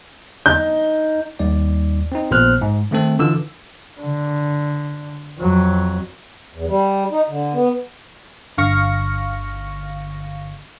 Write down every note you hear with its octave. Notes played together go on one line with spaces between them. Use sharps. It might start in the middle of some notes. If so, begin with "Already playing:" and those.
D#4 G6
D#2 G3 D#4 D5
C4 D#4
A#1 A#2 B3 C5 F6 F#6
G#2
D#3 A3 C4 A4
D3 E3 D#4 F4 E6
D3
F2 F#3
E2
G3
D#4
D3
B3
G1 D3 F5 C#6 A#6 C#7